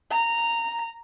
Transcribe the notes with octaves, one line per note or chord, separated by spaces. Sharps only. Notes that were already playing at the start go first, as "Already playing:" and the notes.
A#5